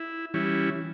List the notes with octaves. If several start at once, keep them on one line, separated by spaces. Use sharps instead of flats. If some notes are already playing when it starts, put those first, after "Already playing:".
Already playing: E4
E3 G3 C#4 E4